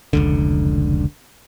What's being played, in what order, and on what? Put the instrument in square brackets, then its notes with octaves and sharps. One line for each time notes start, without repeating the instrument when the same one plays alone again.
[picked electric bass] F1 C#2 D3